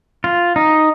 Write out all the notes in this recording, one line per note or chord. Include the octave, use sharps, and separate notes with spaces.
F4
D#4